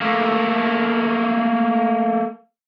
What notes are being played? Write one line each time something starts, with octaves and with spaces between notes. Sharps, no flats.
A3 A#3